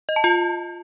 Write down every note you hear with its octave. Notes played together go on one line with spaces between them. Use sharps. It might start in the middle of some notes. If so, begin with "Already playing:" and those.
D#5
A5
F4